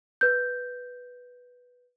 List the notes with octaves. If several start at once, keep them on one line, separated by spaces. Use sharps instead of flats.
B4 G6